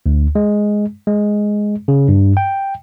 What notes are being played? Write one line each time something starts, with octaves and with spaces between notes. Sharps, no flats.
D2
G#3
G#3
C#3
G2
G5